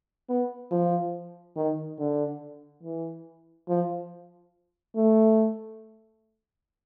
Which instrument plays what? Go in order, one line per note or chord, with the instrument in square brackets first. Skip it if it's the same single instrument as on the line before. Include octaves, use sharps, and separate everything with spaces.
[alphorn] B3
F3
D#3
D3
E3
F3
A3